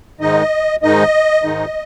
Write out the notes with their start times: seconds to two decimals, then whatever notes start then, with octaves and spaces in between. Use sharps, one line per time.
0.20 G#2 D#3 G#3 D#4 D#5
0.82 G#2 D#3 G#3 D#4 D#5
1.43 G#2 D#3 G#3 D#4